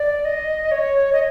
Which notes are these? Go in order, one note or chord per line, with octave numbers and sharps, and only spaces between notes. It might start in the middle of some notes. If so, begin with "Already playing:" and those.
Already playing: D5
D#5
C#5
D#5